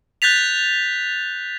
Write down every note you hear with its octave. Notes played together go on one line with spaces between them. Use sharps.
F#6 G6 A6 B6 F7